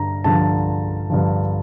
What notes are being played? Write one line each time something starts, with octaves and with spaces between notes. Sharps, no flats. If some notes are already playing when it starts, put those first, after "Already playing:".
Already playing: G2 D3 A#5
G2 D3 F3 A5
G2 D3 F3